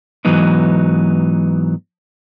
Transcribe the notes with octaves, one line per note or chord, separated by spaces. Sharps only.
G#2 E3 F#3 B3 D#4